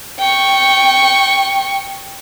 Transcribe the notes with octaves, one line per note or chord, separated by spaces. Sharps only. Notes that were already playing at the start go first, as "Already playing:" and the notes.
G5 C#6